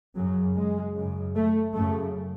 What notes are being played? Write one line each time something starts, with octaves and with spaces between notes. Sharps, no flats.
F#2 C#3 F#3
G#3
F#2 C#3
A3
F#2 C#3 A3